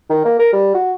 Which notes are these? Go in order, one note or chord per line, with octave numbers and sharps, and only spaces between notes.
D#3
A#3
A#4
G3
F#4